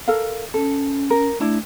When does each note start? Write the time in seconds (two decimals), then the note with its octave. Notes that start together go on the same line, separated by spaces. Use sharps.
0.08 A4 A#4 F5
0.54 C#4 A4
1.10 A#4
1.40 A3 D4 E4